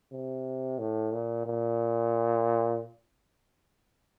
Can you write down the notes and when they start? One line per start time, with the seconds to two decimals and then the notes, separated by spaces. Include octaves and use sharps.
0.12 C3
0.79 A2
1.13 A#2
1.46 A#2